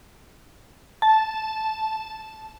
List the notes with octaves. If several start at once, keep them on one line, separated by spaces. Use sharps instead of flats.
A5